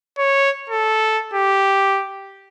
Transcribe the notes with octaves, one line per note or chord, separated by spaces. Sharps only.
C#5
A4
G4